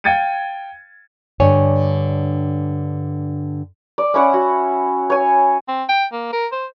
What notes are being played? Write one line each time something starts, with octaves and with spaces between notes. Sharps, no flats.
F5 G5 G#6 A6 C#7 D#7
G2 D3 C#5 G#5
D5
C#4 E4 C#5 F#5
F#4
C#5 G#5
C4
G5
A#3
A#4
C5